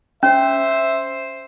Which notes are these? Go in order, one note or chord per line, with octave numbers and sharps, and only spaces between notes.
C#4 C5 E5